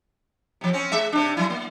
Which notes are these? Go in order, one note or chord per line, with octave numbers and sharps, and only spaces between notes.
C3 F3
C4 C#4
G#3 E5
C3 D4
F#3 E4
A#3